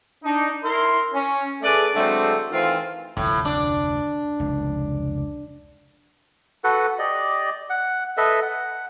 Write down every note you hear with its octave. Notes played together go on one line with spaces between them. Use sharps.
D4 D#4
E4 A#4 C6
C#4
A3 G#4 A4 B4 D5
D3 F#3 G#3 A3 C4
D#3 E3 A3 C4 F4
F1 D2 A2 F3
D4
F1 C#2
F#4 A4 B4 F#5
G4 D5 D#5
F#5
A4 B4 D#5 E5
F#5